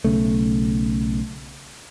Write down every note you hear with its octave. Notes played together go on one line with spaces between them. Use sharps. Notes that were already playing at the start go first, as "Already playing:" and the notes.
B1 C#3 A3